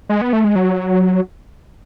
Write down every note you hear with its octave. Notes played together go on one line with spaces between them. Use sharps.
G#3
B3
A3
G#3
F#3